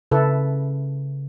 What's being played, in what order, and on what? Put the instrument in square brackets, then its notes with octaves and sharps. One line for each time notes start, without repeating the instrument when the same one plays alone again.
[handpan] C#3 [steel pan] E4 A4 B4